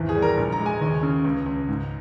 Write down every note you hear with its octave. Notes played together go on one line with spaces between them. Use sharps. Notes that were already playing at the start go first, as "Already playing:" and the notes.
Already playing: G#1 E2
G#4
G3
A#4
A#1
A#5
G#3
G#5
D#2
C#3
C#2
C#2
G#2